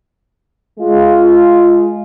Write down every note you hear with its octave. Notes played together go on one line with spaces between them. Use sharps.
G#3 F4